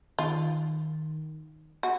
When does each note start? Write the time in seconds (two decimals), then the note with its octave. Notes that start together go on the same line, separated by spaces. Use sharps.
0.18 D#3 F4
1.83 F#4